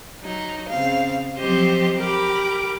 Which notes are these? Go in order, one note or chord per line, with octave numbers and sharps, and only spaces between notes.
F#3 D#4
C#3 C4 F5
F3 F#3 C4 G4 C5 D#5
G4 A#4 B5 D6